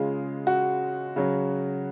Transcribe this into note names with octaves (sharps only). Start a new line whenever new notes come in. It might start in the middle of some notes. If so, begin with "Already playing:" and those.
Already playing: C#3 G#3 F4
F#4
C#3 F#3